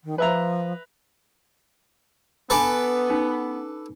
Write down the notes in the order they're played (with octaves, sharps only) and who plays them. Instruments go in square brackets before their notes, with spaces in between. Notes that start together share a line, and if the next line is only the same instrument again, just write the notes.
[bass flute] D#3
[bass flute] F3 [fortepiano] B4 E5 A#5
[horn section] B3 [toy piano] D4 G#5 A#5 [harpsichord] A4 B4 D6
[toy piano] C#4 D#4